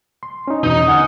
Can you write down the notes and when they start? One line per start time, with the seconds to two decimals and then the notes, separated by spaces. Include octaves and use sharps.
0.23 C6
0.48 C#4 D#4
0.63 E2 B2 D#4
0.88 D3 F#5 G#5 F6